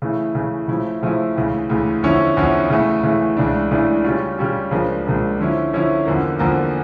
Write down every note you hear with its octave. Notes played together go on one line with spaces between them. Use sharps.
C#3 E3 A3 E4
C#3 E3 A3 E4
C#3 F3 A3 E4
C#3 F3 A3 E4
D2 C#3 E3
D2 C#3 E3
E2 D3 F3 C#4 E4
E2 D3 F3 C#4 E4
C#3 E3 A3
C#3 E3 A3
C#2 C#3 E3 A3 D4
C#2 C#3 E3 A3 D4
C#3 G3 C#4 F4
C#3 G3 C#4 F4
C#2 C#3 F3 A#3 D4
C#2 C#3 F3 A#3 D4
D3 F3 C#4 E4
D3 F3 C#4 E4
E2 D3 F3 A#3
E2 D3 F3 A#3